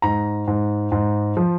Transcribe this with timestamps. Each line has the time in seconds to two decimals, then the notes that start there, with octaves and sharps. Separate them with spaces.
0.02 G#2 A#5
0.48 G#2
0.92 G#2
1.37 F3